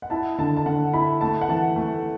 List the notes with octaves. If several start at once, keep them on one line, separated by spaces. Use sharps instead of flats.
F#5
E4 A5
D3 A5
A5
D3 F#5
E4 B5
A3 A5
F#5
E3 A5
A3